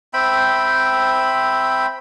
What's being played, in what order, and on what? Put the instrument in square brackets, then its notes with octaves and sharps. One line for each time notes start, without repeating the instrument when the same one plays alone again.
[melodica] C4 E5 G5 B5